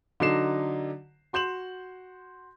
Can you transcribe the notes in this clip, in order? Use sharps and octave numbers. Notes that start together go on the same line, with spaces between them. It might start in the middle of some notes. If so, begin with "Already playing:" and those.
D3 F#3 D#4 C7 E7
F#4 C6 G6 E7 F#7